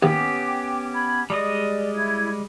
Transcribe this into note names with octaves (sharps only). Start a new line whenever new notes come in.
D#2 B3 C#4 G4 G5 D6
B5 G#6
G3 G#3 D5 D#5
E4 G#6